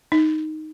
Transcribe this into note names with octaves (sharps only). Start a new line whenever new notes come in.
D#4